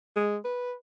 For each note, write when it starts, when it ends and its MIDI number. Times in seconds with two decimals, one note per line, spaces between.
0.16 0.38 56
0.45 0.73 71